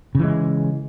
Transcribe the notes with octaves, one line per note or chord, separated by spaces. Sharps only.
C#3 E3 G#3